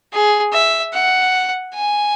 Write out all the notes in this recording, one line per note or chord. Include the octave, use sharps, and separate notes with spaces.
G#4
E5
F#5
G#5